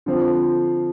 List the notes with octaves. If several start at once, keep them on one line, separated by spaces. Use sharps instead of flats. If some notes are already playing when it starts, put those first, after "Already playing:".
D3 F3 C4